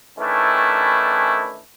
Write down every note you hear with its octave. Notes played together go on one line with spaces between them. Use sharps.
D#3 E3 A3 C#4 D4 E4